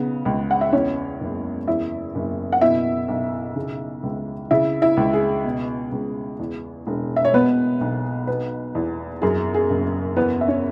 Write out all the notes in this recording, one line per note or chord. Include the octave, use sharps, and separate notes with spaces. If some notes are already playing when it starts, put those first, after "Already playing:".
Already playing: B1 C#3 B3
C#2
F#5
E5
E2 C#4 C#5
F#1
E2 E4 E5
F#1
F#5
B2 E4 E5
B1
C#3
C#2
C#3 E4 E5
E4 E5
C#2
G#4
B2
C#2
E2
E1
E5
C#5
B2 B3 B4
B1
B2 B3 B4
E2
F#2 G#4
G#4
F#1
E2 B3 B4
E5
C#4 C#5